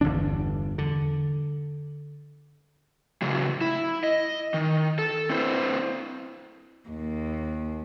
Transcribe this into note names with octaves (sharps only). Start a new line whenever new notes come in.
G1 E2 D3 D4
D3
A2 C#3 F#3
E4
D#5
D#3
A4
C4 E4 B4 C5
D#2